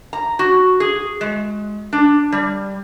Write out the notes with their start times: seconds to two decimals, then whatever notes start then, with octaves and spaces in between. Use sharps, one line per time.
0.13 A#5
0.39 F#4
0.80 G#4
1.21 G#3
1.93 D4
2.32 G3